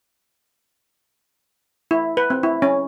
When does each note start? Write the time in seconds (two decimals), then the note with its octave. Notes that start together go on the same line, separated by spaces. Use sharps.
1.91 E4
2.17 B4
2.30 C4
2.43 E4
2.62 C#4